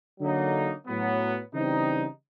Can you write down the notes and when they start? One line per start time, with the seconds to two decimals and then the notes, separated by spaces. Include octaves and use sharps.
0.20 D3 F#3 A#3 D#4
0.87 A2 F#3 B3
1.53 C#3 E3 G3 C4 D#4